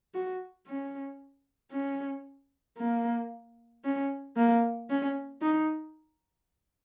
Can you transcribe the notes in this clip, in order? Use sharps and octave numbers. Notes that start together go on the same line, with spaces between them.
F#4
C#4
C#4
A#3
C#4
A#3
C#4
D#4